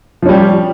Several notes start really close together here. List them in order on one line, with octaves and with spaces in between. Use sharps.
F3 C#4 G3